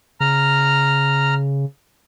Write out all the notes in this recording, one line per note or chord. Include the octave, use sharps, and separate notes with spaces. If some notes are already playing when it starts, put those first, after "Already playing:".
C#3 A#5 F6